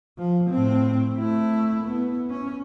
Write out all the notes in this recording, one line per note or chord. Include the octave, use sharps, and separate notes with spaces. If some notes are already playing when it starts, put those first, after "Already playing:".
F3
A2 C4
A3 E4
B3
C#4